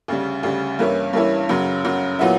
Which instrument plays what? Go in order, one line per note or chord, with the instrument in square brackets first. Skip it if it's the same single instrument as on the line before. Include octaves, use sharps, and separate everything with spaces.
[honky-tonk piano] D2 C#3 G3
D2 C#3 G3
G2 E3 A#3 C#4 E4
G2 E3 A#3 C#4 E4
F#2 C#3 F#3
F#2 C#3 F#3
A#2 F#3 B3 E4